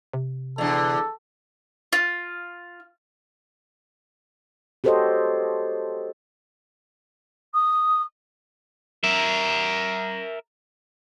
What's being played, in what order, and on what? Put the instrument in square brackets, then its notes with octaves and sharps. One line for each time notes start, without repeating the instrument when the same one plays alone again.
[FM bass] C3
[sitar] E2 D3 [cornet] A4
[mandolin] F4
[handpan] F#4 G4 A4 C5 C#5 D#5
[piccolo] D#6
[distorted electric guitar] A#4 E5